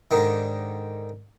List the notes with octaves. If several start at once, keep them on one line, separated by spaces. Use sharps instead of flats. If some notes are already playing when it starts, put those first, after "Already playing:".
G#2 D3 D#3